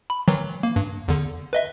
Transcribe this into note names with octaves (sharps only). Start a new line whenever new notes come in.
B5
D#3 E3 F#3
A#3
G2
E2 D3
B4 D#5 E5